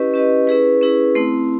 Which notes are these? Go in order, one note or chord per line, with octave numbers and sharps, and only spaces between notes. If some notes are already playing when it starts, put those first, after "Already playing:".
Already playing: C#4 E4 G4 B4 D#5
C#4 E4 G4 B4 D#5
C#4 E4 G#4 B4
C#4 E4 G#4 B4
A3 C4 E4